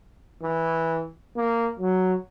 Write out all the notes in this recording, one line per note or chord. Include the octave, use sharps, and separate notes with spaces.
E3
A#3
F#3